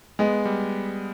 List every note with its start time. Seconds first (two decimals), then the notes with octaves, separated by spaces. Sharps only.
0.19 G#3 B3
0.45 G3